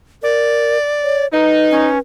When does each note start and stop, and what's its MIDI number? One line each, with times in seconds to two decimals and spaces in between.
0.23 0.77 70
0.23 1.25 74
1.04 1.27 73
1.33 1.88 63
1.33 1.99 71
1.71 1.98 61